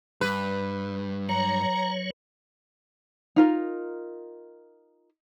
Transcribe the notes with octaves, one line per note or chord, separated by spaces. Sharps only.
G2 B4
F#3 C#5 A#5
D#4 F4 A#4